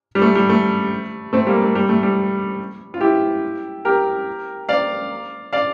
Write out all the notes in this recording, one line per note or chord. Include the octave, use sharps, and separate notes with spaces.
G3
A3
G3
A3
A3 C4
G3 A#3
A3
G3
A3
G3
F4
E4 G4
G4 A#4
D5 F5
D5 F5